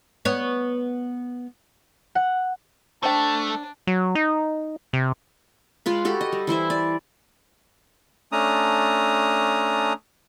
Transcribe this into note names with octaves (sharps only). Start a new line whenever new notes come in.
B3 C#5
F#5
A3 D4 C5 G5 A5
F#3
D#4
C3
G#3 F4 B4
F#4 G4 A4
D#5
G3
E3 E4 C5 E5
D5
A3 C#4 D4 A#5 D#6